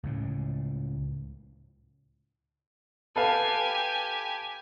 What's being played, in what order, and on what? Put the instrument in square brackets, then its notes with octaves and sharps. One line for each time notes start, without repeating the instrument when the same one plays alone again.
[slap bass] C#2 A2 C#3
[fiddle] G4 G#5 [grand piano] A4 B4 F5